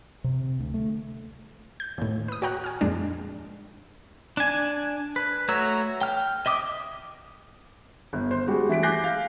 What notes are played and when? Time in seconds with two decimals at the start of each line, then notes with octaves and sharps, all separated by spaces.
0.24 C3
0.59 D2
0.74 A3
1.80 G6
1.98 D#2 A2
2.28 B4 D#6
2.42 F#4 C#5 G5 A#5 F#6
2.64 G#5 F6
2.81 F2 A#2 G#3 D4
4.37 D4 G#5
5.16 B4
5.48 A3 F#4 C#5 A#5 E6
6.01 G5 F6
6.46 D#5 E5 D6 D#6
8.13 G1
8.31 C5
8.47 G3 G#3 F#4
8.69 E3 A3 B6 D7
8.83 G#5 D6 F#6 G6 A#6 C7
9.04 F5